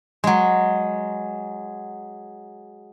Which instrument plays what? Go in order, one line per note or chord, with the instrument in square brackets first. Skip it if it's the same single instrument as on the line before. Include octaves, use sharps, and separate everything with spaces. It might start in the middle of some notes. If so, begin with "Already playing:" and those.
[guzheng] F#3 G#3